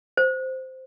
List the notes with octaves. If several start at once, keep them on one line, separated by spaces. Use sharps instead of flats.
C5